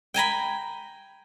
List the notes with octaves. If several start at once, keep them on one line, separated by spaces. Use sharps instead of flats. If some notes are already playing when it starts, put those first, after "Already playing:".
G5 G#5 A#5 B5